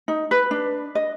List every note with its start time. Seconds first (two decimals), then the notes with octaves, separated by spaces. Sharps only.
0.08 D#4
0.31 B4
0.51 D4
0.95 D#5